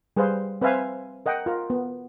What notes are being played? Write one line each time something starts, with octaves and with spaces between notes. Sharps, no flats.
G3 G#4 B4 C5 F5
C4 B4 C5 E5 F5 G#5
A#4 D#5 F#5 G5
F4 A#4
B3